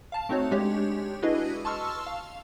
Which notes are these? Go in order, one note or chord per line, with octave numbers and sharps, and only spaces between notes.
F5 A5
A3 C4 D#4 F#4 C#5
G#3 D4 G4 C#5
D4 E4 F#4 G#4 B4 D#5
A5 C6 C#6 E6 F6
F5